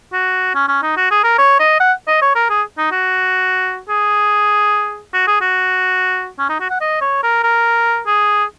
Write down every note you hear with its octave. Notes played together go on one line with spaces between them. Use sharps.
F#4
C#4
C#4
D#4
F#4
G#4
A#4
C#5
D#5
F#5
D#5
C#5
A#4
G#4
D#4
F#4
G#4
F#4
G#4
F#4
C#4
D#4
F#4
F#5
D#5
C#5
A#4
A#4
G#4